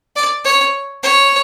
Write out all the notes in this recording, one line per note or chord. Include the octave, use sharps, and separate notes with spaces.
D5
C#5
C#5